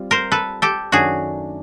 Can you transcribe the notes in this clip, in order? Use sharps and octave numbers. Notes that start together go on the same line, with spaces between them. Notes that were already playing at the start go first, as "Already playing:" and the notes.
Already playing: G3 C4 F4
A#4 C5
A4 B4
G4 A4
F#2 D#3 F#3 A3 D4 F#4 G#4